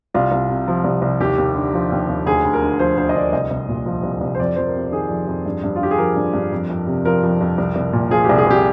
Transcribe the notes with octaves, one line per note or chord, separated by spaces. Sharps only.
C2 F4
C2
C3
F3
C2
C2
D#2 G4
D#2
D3
F3
D#2
D#2
D2 G#4
D2
A#4
D3
F3 C5
D2 C5
D#5
D2 D5
C2 D#5
C2
A#2
F3
C2
C2
C5
F2 D5
F2 C5
A#4
C3
D#3 G#4
F2
F2
G2
G2
F4
D3 G4
G#4
F3 A#4
G2
G2
F2
F2
C3
F3 A#4
F2
F2
C2
C2
A#2
F3 G#4
G4
C2
G#4
C2 G4